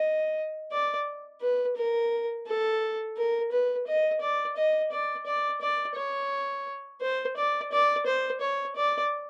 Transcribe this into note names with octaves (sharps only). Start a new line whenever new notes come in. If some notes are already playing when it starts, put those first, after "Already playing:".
Already playing: D#5
D5
B4
A#4
A4
A#4
B4
D#5
D5
D#5
D5
D5
D5
C#5
C5
D5
D5
C5
C#5
D5